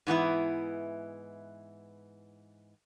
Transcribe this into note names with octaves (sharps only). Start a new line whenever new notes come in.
G#2 E3 B3 E4